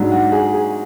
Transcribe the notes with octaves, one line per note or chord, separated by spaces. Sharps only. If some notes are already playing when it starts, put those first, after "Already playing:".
Already playing: G#2 F#3 D4
F#4
G#4
G#4